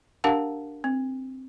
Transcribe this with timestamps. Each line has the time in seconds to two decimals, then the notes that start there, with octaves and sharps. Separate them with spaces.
0.24 D4 G4 A#4 F5 F#5 A5
0.84 C4